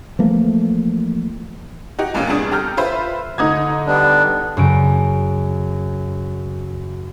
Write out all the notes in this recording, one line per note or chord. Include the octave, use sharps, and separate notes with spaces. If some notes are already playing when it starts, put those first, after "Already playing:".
E3 F3 A3 A#3
D#4 F#4 G4
E2 G2 A#2 A3 A#3 C#4
A1 C3 G3 D4 G#4 D#6
G4 A4 A#5 F6 G6
F4 B4 C5 E5
D3 D#4 D#6 G#6
G3 B3 D4
F#2 C#3 D7